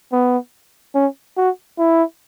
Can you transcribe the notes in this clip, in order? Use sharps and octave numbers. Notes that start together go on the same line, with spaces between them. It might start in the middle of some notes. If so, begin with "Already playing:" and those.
B3
C#4
F#4
E4